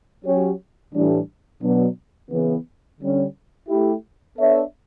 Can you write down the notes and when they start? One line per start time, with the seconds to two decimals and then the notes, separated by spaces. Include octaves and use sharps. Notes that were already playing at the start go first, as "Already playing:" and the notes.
0.25 F#3 C#4 G4 C#5
0.93 A2 E3 G3 D4
1.62 B2 F#3 B3 D4
2.31 C#3 E3 B3
3.01 D3 G3 C#4
3.68 A3 E4 G4
4.38 B3 D4 A4 C#5 E5